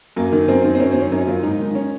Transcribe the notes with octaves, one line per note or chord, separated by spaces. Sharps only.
F#2 A#3
D#3
F#2 C4
D#3
C4
F#2 C#4
D#3 C4
C#4
F#2 D#4
D#3 F4
G#2 D#4
D#3
C#4